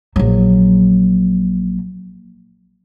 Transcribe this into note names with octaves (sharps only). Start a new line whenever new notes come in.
A#1 F#3